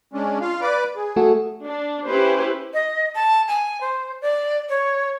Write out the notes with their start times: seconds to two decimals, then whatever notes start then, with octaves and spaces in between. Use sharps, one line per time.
0.13 G#3 C#4 D4
0.41 F4 F5
0.61 B4 D5 D6
0.96 G#4
1.16 A3 F#4 A4
1.65 D4
2.08 C#4 E4 G4 B4 C5
2.74 D#5
3.15 A5
3.48 G#5
3.81 C5
4.22 D5
4.69 C#5